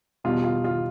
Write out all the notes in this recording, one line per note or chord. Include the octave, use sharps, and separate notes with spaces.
E2 B2 G3 F4
F4
F4